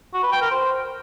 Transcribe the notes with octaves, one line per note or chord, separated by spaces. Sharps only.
F#4
B4
G5
A#4
C5